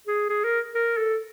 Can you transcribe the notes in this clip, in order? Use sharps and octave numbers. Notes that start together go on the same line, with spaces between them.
G#4
G#4
A#4
A#4
A4